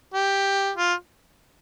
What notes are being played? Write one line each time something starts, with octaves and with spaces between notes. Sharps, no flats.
G4
F4